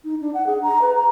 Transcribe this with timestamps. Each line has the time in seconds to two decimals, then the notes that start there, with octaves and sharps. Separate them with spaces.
0.05 D#4
0.21 D4
0.34 F#5
0.47 G#4
0.63 A#5
0.82 B4
0.95 A#5